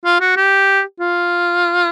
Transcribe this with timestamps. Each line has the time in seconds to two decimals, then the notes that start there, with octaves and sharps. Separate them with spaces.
0.05 F4
0.21 F#4
0.37 G4
1.00 F4